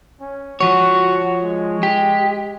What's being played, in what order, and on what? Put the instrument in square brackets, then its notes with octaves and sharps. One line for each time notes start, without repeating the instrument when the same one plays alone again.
[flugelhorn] C#4
[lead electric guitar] F3 C#5 [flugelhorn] F#4
[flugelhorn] G#3
[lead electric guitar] G4